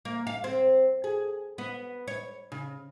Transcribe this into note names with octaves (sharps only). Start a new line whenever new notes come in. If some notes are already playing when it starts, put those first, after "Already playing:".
A#3
F5
C4
G#4
B3
C#5
C#3